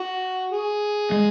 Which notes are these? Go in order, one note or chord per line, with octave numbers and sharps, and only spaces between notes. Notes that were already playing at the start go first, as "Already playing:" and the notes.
Already playing: F#4
G#4
G#3